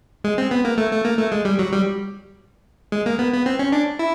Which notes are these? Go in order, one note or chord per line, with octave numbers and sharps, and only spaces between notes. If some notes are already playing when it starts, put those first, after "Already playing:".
G#3
C4
B3
A#3
A3
A3
A#3
A3
G#3
G3
F#3
G3
G#3
A#3
B3
B3
C4
C#4
D4
E4